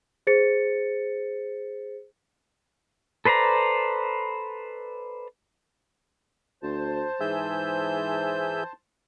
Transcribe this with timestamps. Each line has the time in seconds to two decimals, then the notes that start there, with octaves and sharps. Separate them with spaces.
0.27 G#4 C5 A6 C#7
3.25 A4 B4 C5 D5 A#5
6.63 D2 C5 A5
7.20 G#2 E3 G#4 E5 G6